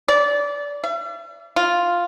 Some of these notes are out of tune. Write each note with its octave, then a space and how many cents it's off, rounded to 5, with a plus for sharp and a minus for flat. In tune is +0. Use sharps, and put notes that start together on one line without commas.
D5 -25
E5 +45
F4 +0